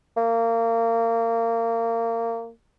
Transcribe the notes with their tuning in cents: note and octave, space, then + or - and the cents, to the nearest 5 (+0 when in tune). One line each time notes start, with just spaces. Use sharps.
A#3 -25